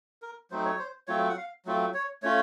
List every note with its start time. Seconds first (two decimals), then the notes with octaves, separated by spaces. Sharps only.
0.22 A#4
0.51 F#3 A3 C4 D#4 C5
0.65 C#5
0.79 C5
1.08 F#3 A3 C4 F4 C#5
1.29 F#5
1.37 F5
1.65 F#3 A3 C4 F4
1.94 C#5
2.23 A3 C#4 F4 C#5